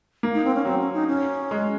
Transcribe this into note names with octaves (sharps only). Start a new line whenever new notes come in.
A#3
D#4
C4
C#4
F#3 C4
C#4
D#4
C#4
G#3